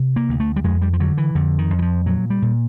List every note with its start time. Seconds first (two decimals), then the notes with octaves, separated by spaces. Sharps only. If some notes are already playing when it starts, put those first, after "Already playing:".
Already playing: C3
0.16 A#3
0.29 D2
0.40 A3
0.56 G3
0.64 F2 G#3
0.82 G3
0.93 F3
1.00 D3 F#3
1.18 E3
1.35 F2 D3
1.58 D#3
1.70 F2
1.79 E3
1.82 F3
2.06 A#2 F#3
2.30 G3
2.42 A#2